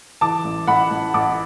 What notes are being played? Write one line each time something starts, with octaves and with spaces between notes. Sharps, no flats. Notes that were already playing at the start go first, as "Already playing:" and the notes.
E3 A5 D6
A1
A1 F#5 B5
A1
A1 A5 D6